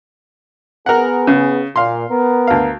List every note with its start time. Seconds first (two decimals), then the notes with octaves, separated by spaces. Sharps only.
0.86 B3 G#4 A#4 F#5
1.27 C#3
1.76 A#2 F5 C6
2.10 B3 A#4
2.47 D2 F5